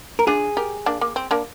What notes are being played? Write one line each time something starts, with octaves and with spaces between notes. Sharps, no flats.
A#4
D4 F4 G#4
G4 A#4
A#3 D4
A#3
C4
A#3 D4